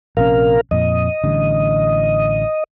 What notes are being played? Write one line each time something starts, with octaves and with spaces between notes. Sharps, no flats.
A#1 C3 C#4 A#4 F5
F2 A#2 D#5
A1 D3 G3